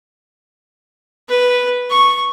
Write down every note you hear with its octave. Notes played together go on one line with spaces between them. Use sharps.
B4
C#6